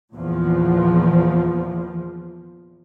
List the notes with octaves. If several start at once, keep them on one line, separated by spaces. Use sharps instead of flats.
E2 A#2 F3